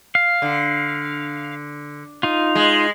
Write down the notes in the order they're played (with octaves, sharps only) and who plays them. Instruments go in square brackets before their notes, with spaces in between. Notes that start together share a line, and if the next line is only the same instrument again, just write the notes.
[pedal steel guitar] F5
[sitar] D3
[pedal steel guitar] D#4 F4
[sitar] G#3